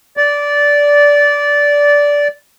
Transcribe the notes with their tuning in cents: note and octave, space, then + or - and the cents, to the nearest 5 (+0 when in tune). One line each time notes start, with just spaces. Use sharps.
D5 -15